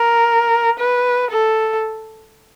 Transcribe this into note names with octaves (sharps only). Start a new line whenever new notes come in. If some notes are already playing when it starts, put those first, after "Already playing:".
Already playing: A#4
B4
A4